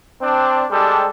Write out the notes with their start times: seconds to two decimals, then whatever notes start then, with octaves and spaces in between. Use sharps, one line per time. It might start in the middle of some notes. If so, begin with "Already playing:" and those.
0.21 C4 D4
0.71 G3 G#3 D4 G4 A4